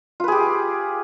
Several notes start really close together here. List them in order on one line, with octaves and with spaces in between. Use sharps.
F4 B4 G#4 G4